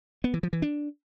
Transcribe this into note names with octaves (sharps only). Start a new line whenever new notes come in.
B3
E3
F3
E3
D4